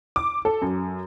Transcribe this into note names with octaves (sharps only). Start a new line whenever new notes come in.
D6
A4
F#2